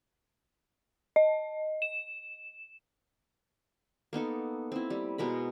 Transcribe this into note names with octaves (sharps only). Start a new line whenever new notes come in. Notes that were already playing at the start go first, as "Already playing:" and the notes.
D#5
E7
A#3 B3 D#4 A4
C4 E4
G3
B2 G#3 A#4 B5